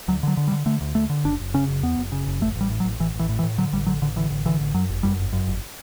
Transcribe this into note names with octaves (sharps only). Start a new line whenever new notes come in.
D2 F#3
D3 F#3
D3
G3
D3
D3 A3
D2
D2 A3
D3
F#1 D4
F#1
C#3 C#4
F#1
E2 B3
F#1
C#3
F#1
A1 A3
A1 G3
A2
F#3
A1
A1 E3
A1
E3
A2
E3
A2
D3 F#3
A1 G3
D3 F#3
A1 D3
D3 E3
A1
D3 E3
A1
F#2 F#3
G1
F#2 G3
G1
F#2
G1